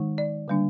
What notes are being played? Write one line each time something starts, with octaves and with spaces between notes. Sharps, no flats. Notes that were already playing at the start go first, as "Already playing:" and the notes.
Already playing: D#3 G#3 D#4
D5
D3 G3 A#3 D4